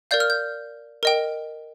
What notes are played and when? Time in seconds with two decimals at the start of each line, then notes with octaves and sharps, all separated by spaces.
0.11 A#4 D5 F5 G6
0.20 F6
0.30 G6
1.03 A#4 D#5 G5